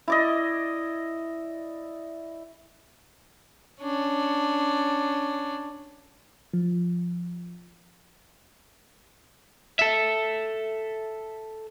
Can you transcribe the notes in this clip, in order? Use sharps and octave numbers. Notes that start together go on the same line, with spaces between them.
E4 D5 D#5
C#4 D4
F3
A4 E5